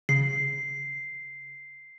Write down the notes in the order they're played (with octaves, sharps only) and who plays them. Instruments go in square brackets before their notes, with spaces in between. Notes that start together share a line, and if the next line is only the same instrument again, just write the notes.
[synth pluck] C#3 [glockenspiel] C7